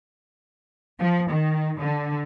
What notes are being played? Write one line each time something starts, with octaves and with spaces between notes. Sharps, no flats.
F3
D#3
D3